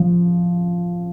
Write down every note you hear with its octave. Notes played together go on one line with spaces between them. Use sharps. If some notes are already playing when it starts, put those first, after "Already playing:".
Already playing: F3